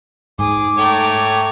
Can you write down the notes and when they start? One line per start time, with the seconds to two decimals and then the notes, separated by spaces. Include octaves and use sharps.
0.39 G#2 G#4 D6
0.78 A3 C#5 G5 A#5